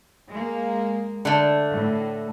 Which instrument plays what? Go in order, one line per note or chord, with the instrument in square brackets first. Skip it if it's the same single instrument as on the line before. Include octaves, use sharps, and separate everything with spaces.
[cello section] G#3 A#3
[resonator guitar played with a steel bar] D3 A3
[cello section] A2